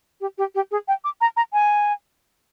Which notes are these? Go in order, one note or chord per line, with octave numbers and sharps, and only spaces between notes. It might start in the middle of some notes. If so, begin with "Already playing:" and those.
G4
G4
G4
G#4
G5
D6
A#5
A#5
G#5